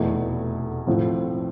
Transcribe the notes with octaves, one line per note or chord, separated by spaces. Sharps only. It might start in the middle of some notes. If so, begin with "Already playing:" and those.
Already playing: F1 E2 B2 A3
A2 F3 C4